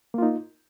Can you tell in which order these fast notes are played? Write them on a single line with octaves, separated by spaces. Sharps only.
A#3 F4 D#4